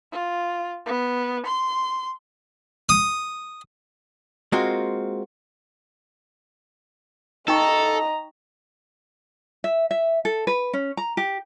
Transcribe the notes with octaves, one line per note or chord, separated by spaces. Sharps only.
F4
B3
C6
D#6
G#3 A#3 C4 F4 F#4 A#4
D#4 A4 D#5 G5 A#5 C#6
E5
E5
A4
B4
C#4
A#5
G4